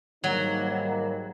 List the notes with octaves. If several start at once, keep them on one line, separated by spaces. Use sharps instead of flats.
G#2 D#3 F#3 G3 A#3 D#4